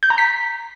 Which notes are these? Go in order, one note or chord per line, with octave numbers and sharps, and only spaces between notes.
G6
A#5
B6